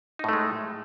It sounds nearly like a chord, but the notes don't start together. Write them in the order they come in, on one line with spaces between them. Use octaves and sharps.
D#4 A2 A3 G#3